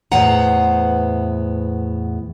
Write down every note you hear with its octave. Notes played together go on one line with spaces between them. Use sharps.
E2 A2 B3 C5 F#5 A#5